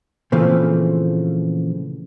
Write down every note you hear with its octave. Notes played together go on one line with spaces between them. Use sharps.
A#2 C#3 E3 F3 A3 C4